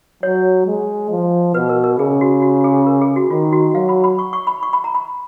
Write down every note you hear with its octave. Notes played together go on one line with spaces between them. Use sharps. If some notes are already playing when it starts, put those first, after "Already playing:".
F#3 C#5
G#3
F3
B2 B4
A#4
A#4
C#3 G#4
F#4
F#4
G#4
A#4
G#4
F#4
D#3 F4
F#4
F#3 F5
B5
B5
C#6
C#6
B5
C#6
B5
A#5
B5